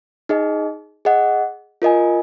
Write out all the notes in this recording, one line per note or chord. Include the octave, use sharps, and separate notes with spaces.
D#4 G#4 D#5
G#4 D#5 F#5
F4 A#4 D#5 G#5